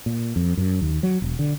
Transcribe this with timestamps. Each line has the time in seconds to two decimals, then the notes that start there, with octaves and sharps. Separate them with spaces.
0.06 A#2
0.36 F2
0.57 F#2
0.82 D#2
1.03 F#3
1.22 E1
1.39 D3